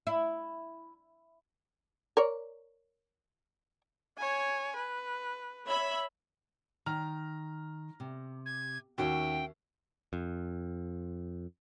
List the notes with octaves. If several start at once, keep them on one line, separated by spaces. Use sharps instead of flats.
E4
A#4 C#5 D5
C#5 G#5
B4
C#5 E5 B5
D#3 A#5 F6
C3
G#6
D#2 C#4 F#4 E5 G5
F2